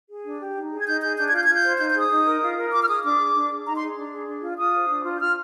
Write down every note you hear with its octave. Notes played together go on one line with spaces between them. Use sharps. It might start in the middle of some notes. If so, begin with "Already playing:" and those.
G#4
D4
G4
D#4
G#4
G#6
D#4 G6
G#4 G6
D4 G6
G#6
F4 G6
F4 G#6
G6
C5
D#4 G6
G6
G#4
D#6
D#4
A#4
F4
A#4
F4 D6
F6
G#4 D#6
D4 D6
G#4
D4
G#4
D#4 A#5
C6
G#4
D4
G#4
D4
F4
F4 D#6
C5
D4
F4
G6
F4 F6